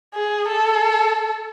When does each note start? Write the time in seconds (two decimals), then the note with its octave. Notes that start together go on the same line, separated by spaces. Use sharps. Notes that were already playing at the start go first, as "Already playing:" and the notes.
0.14 G#4
0.48 A4